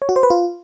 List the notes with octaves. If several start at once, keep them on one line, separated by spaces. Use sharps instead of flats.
C#5
F#4
C5
B4
F4